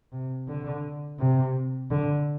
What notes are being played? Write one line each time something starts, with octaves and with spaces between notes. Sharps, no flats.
C3
D3
C3
D3